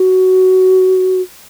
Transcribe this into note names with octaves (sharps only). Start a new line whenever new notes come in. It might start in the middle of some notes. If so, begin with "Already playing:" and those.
Already playing: F#4